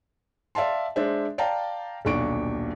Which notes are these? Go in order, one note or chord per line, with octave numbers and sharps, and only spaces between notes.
D5 E5 F5 A5 C6
G#3 D4 C5 E5
D5 F5 G5 A5 A#5
D#1 B1 D4 C#6 D7